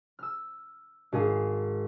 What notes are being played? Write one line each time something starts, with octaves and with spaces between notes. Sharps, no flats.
E6 F6
G#1 G#4 F5